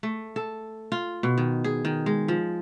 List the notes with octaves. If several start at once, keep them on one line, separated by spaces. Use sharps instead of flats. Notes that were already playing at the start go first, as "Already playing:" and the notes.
A3
A4
F4
B2
D#3
G#4
D#3
G#3
F3